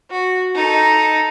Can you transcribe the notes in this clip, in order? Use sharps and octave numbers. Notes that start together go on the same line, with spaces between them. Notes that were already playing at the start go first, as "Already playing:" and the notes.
F#4
D#4 A4